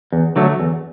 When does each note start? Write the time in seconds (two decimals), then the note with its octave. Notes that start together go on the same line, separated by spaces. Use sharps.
0.12 E2
0.36 D3 F#3 A3
0.60 E2